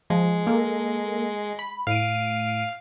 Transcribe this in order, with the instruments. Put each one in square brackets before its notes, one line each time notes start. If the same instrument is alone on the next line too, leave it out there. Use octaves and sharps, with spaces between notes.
[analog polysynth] F3 [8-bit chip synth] G#3
[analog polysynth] A#3 A4 A#4
B5
[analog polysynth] A2 D7 D#7 [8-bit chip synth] F5